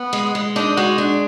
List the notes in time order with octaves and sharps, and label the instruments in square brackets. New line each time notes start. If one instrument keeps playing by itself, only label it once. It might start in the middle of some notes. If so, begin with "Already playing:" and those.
Already playing: [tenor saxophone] B3
[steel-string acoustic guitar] G#3
G#3
[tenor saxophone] D4 [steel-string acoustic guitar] D#4
[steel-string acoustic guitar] G#3 [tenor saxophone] F#4
[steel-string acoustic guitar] D4